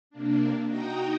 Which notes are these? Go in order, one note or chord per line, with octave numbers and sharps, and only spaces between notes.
C3 A#3 D4
D#4 F#4 G5 A#5 D#6